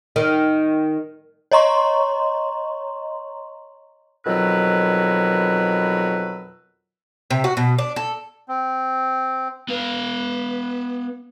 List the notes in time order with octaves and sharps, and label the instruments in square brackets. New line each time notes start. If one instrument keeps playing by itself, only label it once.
[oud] D#3
[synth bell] C#5 D#5 A#5 C6 C#6
[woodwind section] F2 B2 D#3 F#3 B4 E6
[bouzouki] C3
F#4
B2
D4
A4
[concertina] C4
[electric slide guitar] B3 F5 [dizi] B4